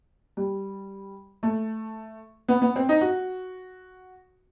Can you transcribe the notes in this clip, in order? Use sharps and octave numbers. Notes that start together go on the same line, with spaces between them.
G3
A3
B3
B3
C4
D#4
F#4